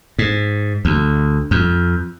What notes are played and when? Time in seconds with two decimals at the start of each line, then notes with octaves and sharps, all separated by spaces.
0.19 G#2
0.85 D2
1.51 F2